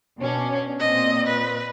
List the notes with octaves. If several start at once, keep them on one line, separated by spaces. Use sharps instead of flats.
B2 C#4 D4
A#2 C4 D#5
B4